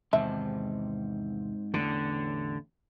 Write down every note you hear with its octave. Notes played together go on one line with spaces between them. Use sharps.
E2 G#2 C3 D#3 C4 E5 A5
A1 E2 A2 D3